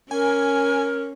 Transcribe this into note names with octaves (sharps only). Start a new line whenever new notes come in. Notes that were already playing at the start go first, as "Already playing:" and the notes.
C#4 A#4 G#5